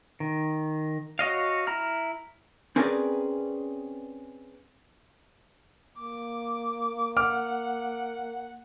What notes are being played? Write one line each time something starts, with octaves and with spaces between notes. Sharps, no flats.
D#3
F#4 C#5 D#5 F5
E4 A#5 F6
C4 C#4 G#4 A#4 B4 D5
A#3 D6
F#5 D6 F6